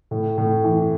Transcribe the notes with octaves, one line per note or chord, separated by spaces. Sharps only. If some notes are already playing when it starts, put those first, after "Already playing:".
A2
A2
E3